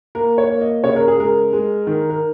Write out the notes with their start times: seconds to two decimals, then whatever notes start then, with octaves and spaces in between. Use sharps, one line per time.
0.15 A#3 A#4
0.38 C#5
0.50 A#3
0.61 D#5
0.84 C#3 C#5
0.96 A#4
1.08 G#4
1.18 G#3 A#4
1.53 G#3
1.87 D#3
2.10 A#4